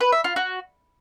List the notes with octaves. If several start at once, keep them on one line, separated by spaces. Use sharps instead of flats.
B4
E5
F4
F#4